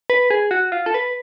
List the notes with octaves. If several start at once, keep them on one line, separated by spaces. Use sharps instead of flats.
B4
G#4
F#4
F4
A4
B4